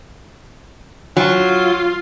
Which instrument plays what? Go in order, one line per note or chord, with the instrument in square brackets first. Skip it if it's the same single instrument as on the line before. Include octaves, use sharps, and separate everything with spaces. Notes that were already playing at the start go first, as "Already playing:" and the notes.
[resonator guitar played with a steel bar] F#3 [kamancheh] F4